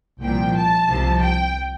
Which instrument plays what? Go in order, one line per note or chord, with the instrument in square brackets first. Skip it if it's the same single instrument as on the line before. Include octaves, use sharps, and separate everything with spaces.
[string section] C2 A#2 F3 G5
A5
C2 C3 F3
G5